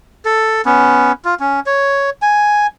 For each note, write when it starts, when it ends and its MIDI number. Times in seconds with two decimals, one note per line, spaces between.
0.25 0.61 69
0.65 1.12 59
0.65 1.12 61
1.25 1.34 65
1.40 1.60 61
1.66 2.10 73
2.22 2.67 80